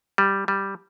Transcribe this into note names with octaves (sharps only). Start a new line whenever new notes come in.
G3
G3